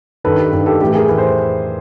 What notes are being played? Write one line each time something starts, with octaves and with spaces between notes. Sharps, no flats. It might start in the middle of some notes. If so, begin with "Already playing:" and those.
G2 D#3 A4 B4
G4
G2 D#3
G4 A4
A2 E3 G4 A4
G#4 A#4
A2 E3 B4
C5